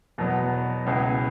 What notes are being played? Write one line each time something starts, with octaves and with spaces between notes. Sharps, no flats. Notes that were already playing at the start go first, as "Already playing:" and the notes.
E2 B2 F#3 B3
C#2 B2 B3 E4 G#4